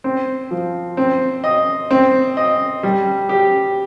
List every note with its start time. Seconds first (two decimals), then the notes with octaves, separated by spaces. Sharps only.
0.04 C4
0.51 F3
0.97 C4
1.44 D#5
1.91 C4
2.37 D#5
2.83 G3
3.29 G4